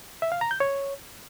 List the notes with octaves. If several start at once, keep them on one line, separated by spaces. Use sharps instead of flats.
E5
F5
A#5
G6
C#5